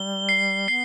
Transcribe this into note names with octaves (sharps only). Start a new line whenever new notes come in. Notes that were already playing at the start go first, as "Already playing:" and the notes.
Already playing: G3 G7
C7
B3 C7